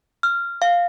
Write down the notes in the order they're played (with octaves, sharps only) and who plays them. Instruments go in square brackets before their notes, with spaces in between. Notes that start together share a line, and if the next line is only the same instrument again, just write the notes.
[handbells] F6
F5